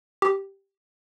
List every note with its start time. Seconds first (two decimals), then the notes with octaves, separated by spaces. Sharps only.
0.22 G4